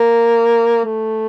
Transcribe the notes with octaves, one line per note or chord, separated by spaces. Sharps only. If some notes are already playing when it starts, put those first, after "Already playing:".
Already playing: A#3
A3